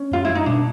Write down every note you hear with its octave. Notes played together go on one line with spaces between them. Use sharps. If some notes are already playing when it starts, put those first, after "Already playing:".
Already playing: C#4
F#2 F4
G3 E4
D#4
B2 D4